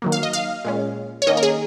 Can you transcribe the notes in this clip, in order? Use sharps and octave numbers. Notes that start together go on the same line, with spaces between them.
D#3 F#3 A#3
F5
D#5
F5
A#2 G#3 C#4
C#5
D#3 A#3 C#4 D#5
A#4
G#4